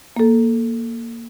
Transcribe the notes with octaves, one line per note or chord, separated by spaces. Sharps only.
A#3 A4